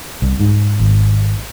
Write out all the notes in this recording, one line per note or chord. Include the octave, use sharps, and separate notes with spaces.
C2
G#2
G#1